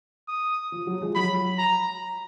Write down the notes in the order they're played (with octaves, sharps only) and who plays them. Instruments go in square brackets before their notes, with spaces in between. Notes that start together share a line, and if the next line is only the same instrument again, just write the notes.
[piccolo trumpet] D#6
[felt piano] F3
F#3
F3 G#3
[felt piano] F#3 [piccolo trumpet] B5
[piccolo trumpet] A#5